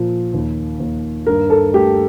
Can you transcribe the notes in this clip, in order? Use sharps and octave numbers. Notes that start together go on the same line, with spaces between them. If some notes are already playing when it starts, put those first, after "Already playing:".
Already playing: A#2 F3
D#2
D#2
G2 A#4
A4
A3 G4